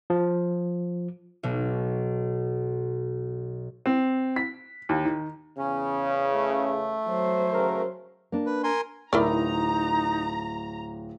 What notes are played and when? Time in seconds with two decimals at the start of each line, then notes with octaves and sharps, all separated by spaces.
0.10 F3
1.43 B1 B2
3.86 C4
4.36 B6
4.89 D#2
5.05 D#3
5.58 E2 C#3 C#4
6.33 A3
7.07 F#3 C5
7.53 C#3 F#4 A#4
8.32 A#3 D4
8.46 B4
8.64 A#4 G#5 C6
9.13 D1 D#4 E4 A#4 D5 A#5